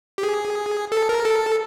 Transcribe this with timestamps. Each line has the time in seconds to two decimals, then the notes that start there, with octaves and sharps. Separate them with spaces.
0.18 G4
0.23 G#4
0.92 A4
1.09 A#4
1.25 A4